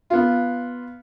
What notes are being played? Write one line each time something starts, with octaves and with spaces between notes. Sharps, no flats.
B3 F4